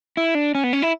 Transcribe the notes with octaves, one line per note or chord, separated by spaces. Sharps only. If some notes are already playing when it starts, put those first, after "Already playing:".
E4
D4
C#4
B3
C#4
E4